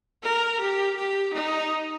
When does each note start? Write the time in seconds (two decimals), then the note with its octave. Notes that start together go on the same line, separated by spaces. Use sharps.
0.23 A#4
0.60 G4
0.96 G4
1.33 D#4